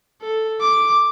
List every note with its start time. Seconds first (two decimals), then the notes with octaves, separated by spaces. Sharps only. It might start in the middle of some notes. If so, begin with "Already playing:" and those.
0.22 A4
0.61 D6